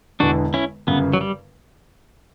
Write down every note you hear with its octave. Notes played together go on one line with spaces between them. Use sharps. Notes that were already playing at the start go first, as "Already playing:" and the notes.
E1 E2 D3 D4 F#4
C#4 E4
G1 F#2 C#3 B3
F#3
G3